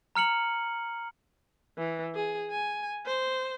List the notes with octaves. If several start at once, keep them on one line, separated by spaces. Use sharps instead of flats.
A#5 F6 C#7 F#7
E3
G#4
G#5
C5